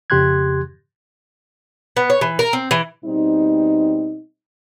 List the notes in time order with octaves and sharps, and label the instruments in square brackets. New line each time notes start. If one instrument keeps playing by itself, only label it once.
[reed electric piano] F2 C#3 G4 C6 F#6 G#6
[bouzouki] B3
C#5
E3
A#4
C4
E3
[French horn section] B2 G3 C4 D#4